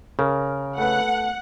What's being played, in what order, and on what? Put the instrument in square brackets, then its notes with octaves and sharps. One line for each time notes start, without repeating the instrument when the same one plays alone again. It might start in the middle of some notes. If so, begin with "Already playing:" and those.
[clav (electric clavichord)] C#3 [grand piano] A#4
[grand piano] A3 B4 [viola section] F#5